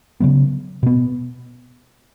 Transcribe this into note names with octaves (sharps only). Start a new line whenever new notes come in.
C#3 F#3 B3
B2 B3